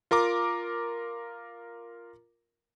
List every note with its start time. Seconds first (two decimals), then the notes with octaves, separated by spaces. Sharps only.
0.11 F4 A#4 A#5 D6